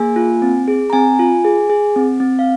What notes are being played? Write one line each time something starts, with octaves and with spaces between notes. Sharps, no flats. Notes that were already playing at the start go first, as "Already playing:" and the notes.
Already playing: A#3 G#4 G#5
F4
C4
G#4
A#5
C4 G#5
F4
G#4
G#4
C4
C4
F5